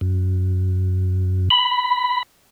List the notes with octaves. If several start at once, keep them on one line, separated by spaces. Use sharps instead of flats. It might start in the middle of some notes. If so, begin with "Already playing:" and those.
F#2
B5